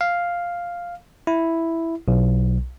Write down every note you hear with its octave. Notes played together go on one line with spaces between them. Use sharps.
F5
E4
B1